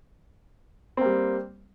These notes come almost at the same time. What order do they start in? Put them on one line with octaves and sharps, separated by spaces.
C4 A#3 G3